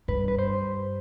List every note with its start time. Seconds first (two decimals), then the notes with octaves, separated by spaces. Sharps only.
0.08 G2 B4
0.28 B4
0.39 C5